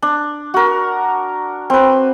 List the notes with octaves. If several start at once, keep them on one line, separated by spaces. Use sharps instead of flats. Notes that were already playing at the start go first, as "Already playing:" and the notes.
D4
F#4 A#4
C4 B4